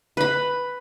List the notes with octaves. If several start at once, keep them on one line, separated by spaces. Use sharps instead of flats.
B4 B5